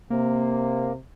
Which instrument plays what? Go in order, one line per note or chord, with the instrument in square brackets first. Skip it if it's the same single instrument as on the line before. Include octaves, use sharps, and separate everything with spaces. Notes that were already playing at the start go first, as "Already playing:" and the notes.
[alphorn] C3 [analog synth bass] A#3